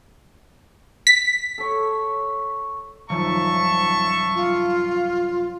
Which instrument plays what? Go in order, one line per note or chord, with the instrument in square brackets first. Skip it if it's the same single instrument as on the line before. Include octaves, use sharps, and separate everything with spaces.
[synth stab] B6
[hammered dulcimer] A4 C#5
[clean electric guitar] C2 F#2 [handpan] D#3 F3 [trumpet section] E5 A5 C#6
[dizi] F4